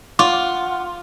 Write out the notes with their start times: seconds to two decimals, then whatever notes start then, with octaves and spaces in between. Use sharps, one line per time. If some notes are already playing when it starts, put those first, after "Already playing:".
0.19 F4 F#5 D6